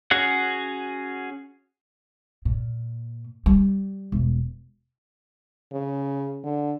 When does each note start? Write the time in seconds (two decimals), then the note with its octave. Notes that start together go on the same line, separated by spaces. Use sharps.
0.11 C#4 F#4 G#4 F#5
2.45 A#2
3.46 G3
4.12 E1
5.73 C#3
6.44 D3